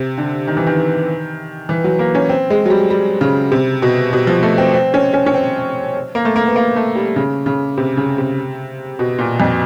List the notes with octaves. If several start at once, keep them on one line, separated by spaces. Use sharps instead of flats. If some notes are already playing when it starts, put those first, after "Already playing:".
Already playing: C3
D3
D#3
E3
D#3
E3
F#3
A#3
C#4
C4
G#3
F#3
G3
G3
C#3
C3
B2
B2
F3
A3
C4
C4
C#4
C#4
C#4
C4
A#3
A3
A#3
B3
A#3
A3
G3
C#3
C#3
C3
C#3
C3
B2
A#2
F2